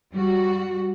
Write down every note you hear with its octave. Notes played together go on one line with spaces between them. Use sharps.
G3 F#4